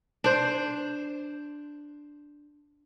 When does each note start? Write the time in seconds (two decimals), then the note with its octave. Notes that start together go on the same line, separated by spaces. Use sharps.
0.24 D4 C5